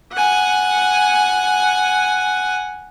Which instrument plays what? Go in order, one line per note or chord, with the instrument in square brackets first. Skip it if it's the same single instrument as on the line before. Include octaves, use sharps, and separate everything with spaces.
[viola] F#5 G#5